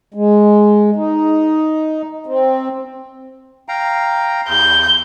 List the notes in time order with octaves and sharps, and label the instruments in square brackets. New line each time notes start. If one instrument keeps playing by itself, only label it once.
[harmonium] G#3
D#4
C4
[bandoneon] F5 G5 A#5
[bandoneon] E2 [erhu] G6